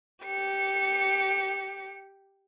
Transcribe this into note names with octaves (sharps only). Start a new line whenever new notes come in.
G4 C#7